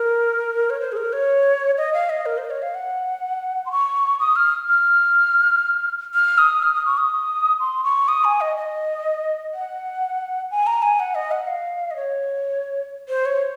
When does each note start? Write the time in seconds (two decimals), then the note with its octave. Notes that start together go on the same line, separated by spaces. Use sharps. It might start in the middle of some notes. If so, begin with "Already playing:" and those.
Already playing: A#4
0.70 C#5
0.80 C5
0.92 G#4
0.97 A#4
1.13 C#5
1.78 D#5
1.94 F5
2.10 D#5
2.26 A#4
2.38 C5
2.45 D#5
2.50 C#5
2.62 F5
2.75 F#5
3.66 C6
3.72 C#6
4.20 D#6
4.36 F6
4.69 F6
6.14 F6
6.38 D#6
6.63 F6
6.74 D#6
6.86 C#6
6.97 D#6
7.60 C6
7.84 C#6
8.08 D#6
8.24 G#5
8.41 D#5
8.56 D#5
9.54 F#5
10.51 G#5
10.67 A#5
10.82 G#5
11.00 F#5
11.15 D#5
11.31 F#5
11.47 F5
11.91 D#5
11.96 C#5
13.09 C5
13.26 C#5